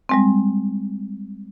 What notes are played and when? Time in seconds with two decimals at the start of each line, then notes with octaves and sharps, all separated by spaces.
0.09 G3 G#3 C4